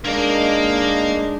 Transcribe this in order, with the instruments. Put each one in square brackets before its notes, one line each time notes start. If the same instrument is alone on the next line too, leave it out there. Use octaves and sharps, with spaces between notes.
[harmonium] G#3 D4 D#4 [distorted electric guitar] A#3 A#4